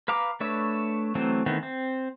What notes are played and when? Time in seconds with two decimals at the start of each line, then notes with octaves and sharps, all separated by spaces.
0.08 B4 F5 A#5 D6
0.40 A3 D4 B4 C#5 E5
1.15 E3 F#3 A3 C4
1.46 D#3 E3 A3 B3 C4
1.63 C4